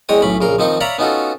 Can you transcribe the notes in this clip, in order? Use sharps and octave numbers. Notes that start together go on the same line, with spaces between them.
E2 G#3 C#5 D#5 G5 D#6
B1 A2 C#4 B5
A#1 C#3 A#4 C6
D#2 F3 C4 D#4 C6 C#6
C#5 D5 E5 F5 A#5 B5
B3 C#4 D#4 F4 F#4 A4